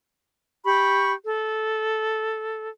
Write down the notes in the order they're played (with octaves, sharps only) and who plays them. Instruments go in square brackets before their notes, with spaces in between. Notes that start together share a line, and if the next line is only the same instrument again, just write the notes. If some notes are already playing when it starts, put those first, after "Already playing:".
[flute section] G4 B5 C#6
A4